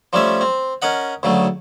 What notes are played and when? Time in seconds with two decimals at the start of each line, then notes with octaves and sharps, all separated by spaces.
0.13 F3 G3 A3 C#4 E5
0.41 C4
0.82 C#4 A#4 D#5 F#5
1.23 D2 C#3 F#3 A3